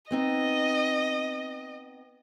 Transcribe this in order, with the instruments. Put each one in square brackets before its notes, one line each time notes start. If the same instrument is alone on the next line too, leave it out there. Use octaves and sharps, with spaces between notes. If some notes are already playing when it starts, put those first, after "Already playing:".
[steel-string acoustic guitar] B3 C4 D#4 [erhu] D#5